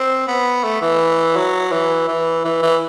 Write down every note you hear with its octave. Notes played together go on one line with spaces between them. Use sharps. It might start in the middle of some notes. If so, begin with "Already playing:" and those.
Already playing: C4
B3
A3
E3
F#3
E3
E3
E3
E3